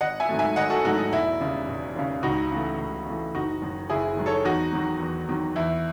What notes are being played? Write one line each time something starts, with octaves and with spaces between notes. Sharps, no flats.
G#1 D#5 F#5
E5 G#5
G#2 D#3 F#3 A3
E5 G#5
G#1 D#5 F#5
F#4 A4
G#2 D#3 F#3 A3 D#4 F#4
D#4
E1 E4
D#2 C#3
E1
D#2 C#3
C#2 D#4 F#4
C#3 E3 A3
C#2
C#3 E3 A3
F#1 D#4 F#4
F#2 D#3
F#1 E4 G#4
F#2 D#3
A4 C#5
E2 D#4 F#4
D#3 F#3
E2
D#3 F#3
E2 E4